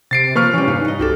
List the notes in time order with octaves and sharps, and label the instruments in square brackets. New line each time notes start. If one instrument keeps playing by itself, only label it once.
[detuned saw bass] C3 [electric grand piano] A6 C7 D7
[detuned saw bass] F3 [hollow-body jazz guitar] A#3 [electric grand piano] B4 C#6 F6
[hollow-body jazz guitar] E3 G3 [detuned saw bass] C#4
[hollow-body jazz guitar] C2 D#4 F5 [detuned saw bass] G2
[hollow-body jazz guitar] D#4 D#5
[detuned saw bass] C2 [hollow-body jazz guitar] F#4 G4 A4